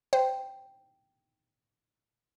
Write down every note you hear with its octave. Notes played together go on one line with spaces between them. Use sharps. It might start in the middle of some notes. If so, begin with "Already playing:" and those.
C5 G5